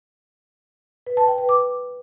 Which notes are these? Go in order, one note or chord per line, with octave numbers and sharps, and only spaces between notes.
B4
A5
G5
B4
D6